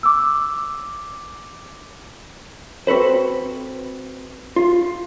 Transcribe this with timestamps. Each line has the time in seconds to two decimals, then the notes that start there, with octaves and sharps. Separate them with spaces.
0.03 D6 E6
2.87 C4 F#4 A4 B4 C5
4.56 F4